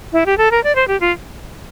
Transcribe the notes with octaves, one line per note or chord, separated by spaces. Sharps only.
E4
G4
A4
A#4
D5
C5
G4
F4